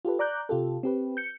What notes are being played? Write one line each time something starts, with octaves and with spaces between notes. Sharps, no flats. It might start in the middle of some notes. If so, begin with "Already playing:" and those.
F4 G4 A4 B4
D5 A#5 D6 F#6 G6
C3 F4 G4 A4
C4 G4 B4
G6 C#7